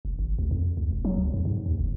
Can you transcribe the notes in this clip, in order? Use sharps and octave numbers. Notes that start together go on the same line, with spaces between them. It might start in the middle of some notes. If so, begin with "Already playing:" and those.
F1
G#1
D2
F2
C#2
E1
F#3
C#2
F2
G#2
D#2
F#1